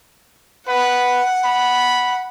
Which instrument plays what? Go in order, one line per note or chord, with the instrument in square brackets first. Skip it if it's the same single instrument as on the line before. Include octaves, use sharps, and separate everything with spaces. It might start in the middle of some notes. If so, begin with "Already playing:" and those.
[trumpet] B4 [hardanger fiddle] F#5
[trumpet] B5